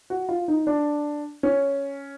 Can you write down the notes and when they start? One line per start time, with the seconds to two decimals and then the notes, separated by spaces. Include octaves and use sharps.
0.10 F#4
0.29 F4
0.48 D#4
0.67 D4
1.43 C#4